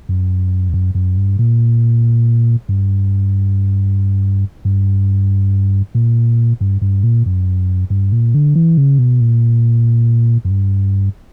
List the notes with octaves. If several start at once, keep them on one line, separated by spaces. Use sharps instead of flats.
F#2
E2
F#2
F#2
G2
A#2
G2
G2
A#2
G2
G2
A#2
F#2
G2
A#2
D3
E3
C#3
B2
A#2
F#2
G2